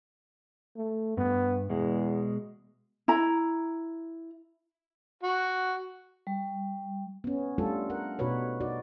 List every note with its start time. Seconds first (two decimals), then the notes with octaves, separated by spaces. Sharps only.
0.76 A3
1.17 G2 B3
1.70 E2 B2 G#3
3.08 E4 A#5
5.23 F#4
6.27 G3
7.24 B3 C#4
7.58 G3 A3 D4 F4 A4
7.90 A#4 F#5
8.19 B2 D#4 F#4 B4 C#5
8.61 D#4 F#4 D5